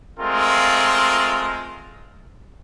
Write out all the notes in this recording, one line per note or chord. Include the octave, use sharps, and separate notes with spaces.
G#3 A3 C4 F4 A#4